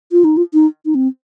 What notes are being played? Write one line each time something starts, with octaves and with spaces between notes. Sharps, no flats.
F4
D#4
F4
D#4
D#4
C4